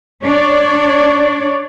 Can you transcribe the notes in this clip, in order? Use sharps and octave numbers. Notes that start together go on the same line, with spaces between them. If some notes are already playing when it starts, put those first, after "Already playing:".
D4 C#5 D5